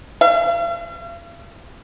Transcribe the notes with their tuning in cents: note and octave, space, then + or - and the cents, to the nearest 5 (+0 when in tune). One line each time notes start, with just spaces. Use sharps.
F5 -45